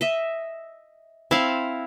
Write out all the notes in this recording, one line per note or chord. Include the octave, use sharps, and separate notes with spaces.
D#5 E5
C4 E4 F5 A5